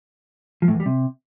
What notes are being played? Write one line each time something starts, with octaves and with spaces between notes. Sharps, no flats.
F3
A2
E2
G3
C3